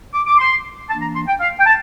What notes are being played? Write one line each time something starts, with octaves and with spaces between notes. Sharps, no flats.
D6
D6
C6
E3 A#3 D4 A5
A#5
C6
G5
F5
G5
A5